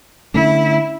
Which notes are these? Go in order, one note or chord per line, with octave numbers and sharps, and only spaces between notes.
D3 A3 C#4 E4